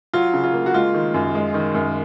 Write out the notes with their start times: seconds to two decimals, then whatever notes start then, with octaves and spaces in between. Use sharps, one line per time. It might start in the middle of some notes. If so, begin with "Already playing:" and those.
0.13 F#3 F4
0.34 C#3
0.44 F4
0.54 A#3
0.66 F#4
0.74 G#3 F4
0.94 D#3
1.14 F#2
1.35 G#3
1.54 D#3
1.74 F#2